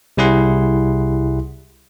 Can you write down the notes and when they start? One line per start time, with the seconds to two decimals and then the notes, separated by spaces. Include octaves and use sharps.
0.17 C2 G3 E4 G#4 F#5 C6